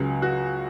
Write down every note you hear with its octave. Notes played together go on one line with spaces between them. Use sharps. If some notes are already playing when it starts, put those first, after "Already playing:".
Already playing: C#2 C#3 F#3 G#4
F#4